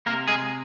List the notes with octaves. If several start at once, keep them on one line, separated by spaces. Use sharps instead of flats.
C3 A#3 A#4
G#3 G#4